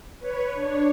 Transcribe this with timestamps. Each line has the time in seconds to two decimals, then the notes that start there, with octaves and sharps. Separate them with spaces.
0.19 B4 C#5
0.54 D4 C#5